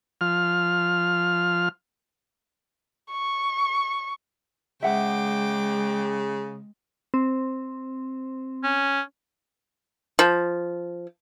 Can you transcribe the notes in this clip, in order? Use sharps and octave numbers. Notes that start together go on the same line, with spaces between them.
F3 F6
C#6
C#3 G#3 E5 F#5 G5 D6
C4
C#4
F3